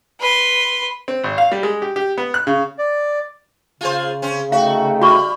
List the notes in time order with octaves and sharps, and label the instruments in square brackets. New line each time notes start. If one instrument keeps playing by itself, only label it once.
[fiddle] B4 C6
[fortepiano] C4
G#1
F5
G3
G#3
G4
G4
B3
F#6
C#3
[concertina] D5
[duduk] C#3 [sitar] F4 G#4 C5
[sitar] C4 C#4
[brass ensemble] A3 D#4 G5 [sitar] F#4 [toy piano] F5
[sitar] G3 [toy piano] F#4 C#6 D6